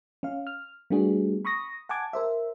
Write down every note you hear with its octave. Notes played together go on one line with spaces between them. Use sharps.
C#4 F5
F6
G3 A3 B3 D4 F#4 G#4
B5 C#6 D#6 A#6
F#5 G#5 A5 D6 G#6
A#4 C5 E5